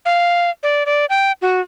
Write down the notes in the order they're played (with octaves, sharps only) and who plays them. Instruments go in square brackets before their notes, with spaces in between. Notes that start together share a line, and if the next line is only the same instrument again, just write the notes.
[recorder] F5
D5
D5
G5
F#4